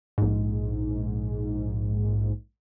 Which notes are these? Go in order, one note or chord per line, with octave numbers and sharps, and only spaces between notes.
A#1 G#2